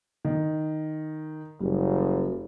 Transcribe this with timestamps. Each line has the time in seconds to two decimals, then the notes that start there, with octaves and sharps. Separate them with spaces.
0.25 D#3
1.60 F#1 G3